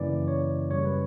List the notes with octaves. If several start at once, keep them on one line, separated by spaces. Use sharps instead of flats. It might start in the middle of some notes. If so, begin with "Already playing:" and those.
Already playing: F#2 C#3 E3 A#3 D5
C#5
F#2 C#3 G3 C#5
B4